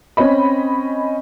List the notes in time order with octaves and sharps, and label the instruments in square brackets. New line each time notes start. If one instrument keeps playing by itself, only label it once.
[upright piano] C4 C#4 C#5 D#5 B5